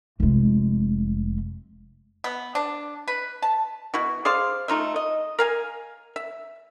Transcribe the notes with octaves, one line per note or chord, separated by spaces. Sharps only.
F1 G#3
B3
D4
B4
A5
B2 E4 F#4
G#4 C5 D5 F5
A3 D#4 F4 E5
D#5
A#4 F5 G#5
E5